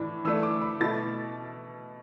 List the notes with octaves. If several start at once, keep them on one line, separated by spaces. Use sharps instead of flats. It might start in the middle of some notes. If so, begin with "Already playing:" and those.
Already playing: A2 E3 D4
E3 A3 D4 E6
D6
B5
B2 A3 E4 A6